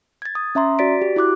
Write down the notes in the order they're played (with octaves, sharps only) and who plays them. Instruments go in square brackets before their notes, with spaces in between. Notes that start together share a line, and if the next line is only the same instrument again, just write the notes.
[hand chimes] G#6 A6
D#6
C#4 E5 A#5 C6
F#4 D5 A6 B6 D7
G4
E4 F#4 D6 F#6